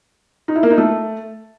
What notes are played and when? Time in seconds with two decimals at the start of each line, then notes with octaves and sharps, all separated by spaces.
0.48 D#4
0.56 E4
0.63 A#3
0.70 D#4
0.78 A3